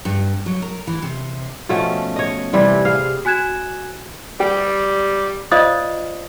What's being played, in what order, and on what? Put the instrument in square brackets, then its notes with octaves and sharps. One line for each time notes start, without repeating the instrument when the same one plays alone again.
[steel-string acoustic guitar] G2
F#3
A#4
E3
C3
[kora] B2 F3 A3 C#4
C#5 D#5
C3 E3 G3 C4
G#4 F5
[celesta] F#4 G#5 F#6 G#6 E7
[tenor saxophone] G3 [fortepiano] G4
[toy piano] F4 C5 D5 D#5 F5 D#6